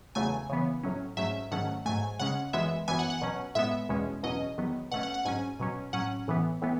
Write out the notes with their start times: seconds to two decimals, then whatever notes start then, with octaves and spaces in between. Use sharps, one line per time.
0.15 E2 C#3 F#3 A3 G#5
0.49 C#3 E3 B3
0.83 A2 F#3 C#4
1.17 G#2 F#3 A3 C#4 E5
1.51 G#2 D#3 F#3 A3 C#4 F#5
1.86 G#2 F#3 A3 G#5
2.19 C#3 G#3 C#4 F#5
2.53 F#2 E3 G#3 B3 E5
2.88 F#2 E3 B3 G#5
2.99 F#5
3.10 F#5
3.22 B2 F#3 C#4
3.55 A2 G#3 B3 E5
3.89 E2 B2 G#3 C#4
4.23 E2 B2 F#3 C#4 D#5
4.58 E2 D#3 F#3 B3
4.92 B2 A3 C#4 F#5
5.03 F#5
5.14 F#5
5.25 G#2 F#3 C#4 G#5
5.60 B2 F#3 C#4
5.93 A2 F#3 C#4 F#5
6.28 A2 E3 B3
6.62 A2 E3 B3